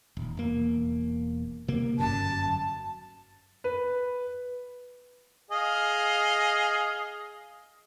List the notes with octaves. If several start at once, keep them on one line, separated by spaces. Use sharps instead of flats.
D#1
E1 A#3
C3 A#3
G1 F#2 A5
B4
G#4 D#5 F5